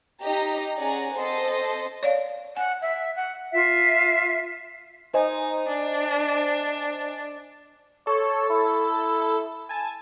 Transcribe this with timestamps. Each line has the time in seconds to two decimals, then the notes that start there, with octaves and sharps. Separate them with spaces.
0.22 D#4 G4 D#5 A#5
0.75 C#4 G#4 D5 F#5 G#5 A#5
1.13 C4 A4 C5 D#5 C6
2.03 C#5 D5 F5
2.56 F#5 G#5
2.82 E5
3.16 F#5
3.53 F4 E5
5.14 D#4 C5 D#5 G#5
5.68 D4
8.07 A4 C#5
8.50 E4
9.69 G#5 A5